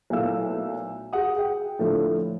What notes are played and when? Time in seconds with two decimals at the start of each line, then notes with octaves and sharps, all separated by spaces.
0.10 B1 A#2 A3 E4 F5 E6
1.13 F#4 G#4 F#5 D#6
1.36 G#4 G5
1.79 A2 D3 F3 A3 E4